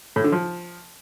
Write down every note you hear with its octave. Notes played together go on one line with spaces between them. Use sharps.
A2
D3
F3